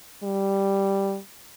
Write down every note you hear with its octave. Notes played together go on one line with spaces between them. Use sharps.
G3